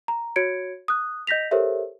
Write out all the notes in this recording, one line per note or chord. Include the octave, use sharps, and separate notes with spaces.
A#5
F#4 C#5 G#6 C#7 D7
D#6 F#6
D#5 G6 A#6 B6 F7
G4 A4 A#4 C5 C#5 E5